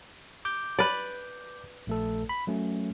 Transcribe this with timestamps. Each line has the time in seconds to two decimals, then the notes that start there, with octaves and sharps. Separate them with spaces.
0.45 D6 G6
0.79 B4 D5
1.87 A#1 A3 A4
2.29 B5
2.47 F#3 A3 C#4